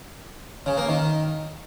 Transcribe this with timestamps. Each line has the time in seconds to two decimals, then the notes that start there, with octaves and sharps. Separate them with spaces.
0.66 C#3
0.77 A#3
0.89 D#3